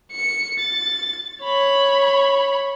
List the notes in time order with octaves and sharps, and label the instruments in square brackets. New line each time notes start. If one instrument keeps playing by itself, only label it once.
[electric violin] C#7
A6
C#5 B5